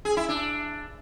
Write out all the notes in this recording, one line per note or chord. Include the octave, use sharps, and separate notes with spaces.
G#4
E4
D4